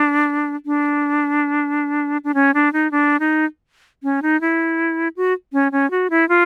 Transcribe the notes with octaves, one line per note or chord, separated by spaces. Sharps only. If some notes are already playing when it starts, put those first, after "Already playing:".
Already playing: D4
D4
D4
C#4
D4
D#4
D4
D#4
C#4
D#4
E4
F#4
C#4
C#4
F#4
E4
F4